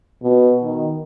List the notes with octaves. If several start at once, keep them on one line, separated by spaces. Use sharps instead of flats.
B2
D#3